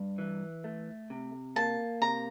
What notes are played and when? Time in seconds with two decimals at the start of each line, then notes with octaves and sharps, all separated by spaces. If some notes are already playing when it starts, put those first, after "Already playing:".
Already playing: G2
0.18 E3
0.64 A3
1.10 C3
1.56 A#3 A5
2.02 C3 A#5